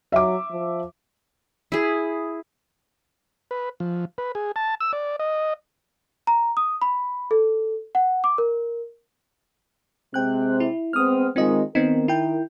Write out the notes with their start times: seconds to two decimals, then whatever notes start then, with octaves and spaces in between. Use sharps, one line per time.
0.12 F#3 E5 D6
0.50 F3
1.72 E4 G#4
3.51 B4
3.80 F3
4.18 B4
4.35 G#4
4.56 A5
4.80 E6
4.93 D5
5.20 D#5
6.27 A#5
6.57 D#6
6.82 B5
7.31 A4
7.95 F#5
8.24 D6
8.38 A#4
10.14 C3 G#3 C4 G5 F#6
10.60 E4
10.93 G#3 B3 C4 D#6 F6
11.36 D#3 G#3 C4 F4 D#5
11.75 D#3 B3 C4 D#4 A#4
12.08 E4 G5